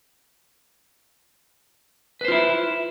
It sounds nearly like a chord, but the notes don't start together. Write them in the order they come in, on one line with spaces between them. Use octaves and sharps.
B4 C5 F4 E4